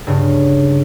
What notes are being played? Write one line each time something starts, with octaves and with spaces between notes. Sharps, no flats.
G2 C#3